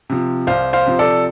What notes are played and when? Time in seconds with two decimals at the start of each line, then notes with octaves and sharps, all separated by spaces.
0.10 C3 F3
0.47 C2 C5 F5
0.73 C5 F5
0.86 C3 F3
0.99 A4 D5